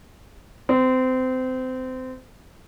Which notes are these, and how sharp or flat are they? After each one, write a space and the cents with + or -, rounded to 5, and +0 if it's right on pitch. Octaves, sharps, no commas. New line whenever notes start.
C4 -25